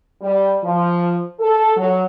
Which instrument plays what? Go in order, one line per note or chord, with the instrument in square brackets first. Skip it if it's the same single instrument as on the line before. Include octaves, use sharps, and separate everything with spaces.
[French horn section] G3
F3
A4
F#3